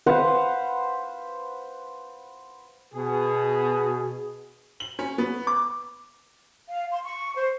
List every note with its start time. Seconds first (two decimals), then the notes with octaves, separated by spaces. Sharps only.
0.06 B4 C5 F5 F#5
2.94 B2 G#4
4.80 F#7
4.99 C#4
5.18 B3
5.47 D6
6.69 F5
6.91 C6
7.04 C#6
7.36 C5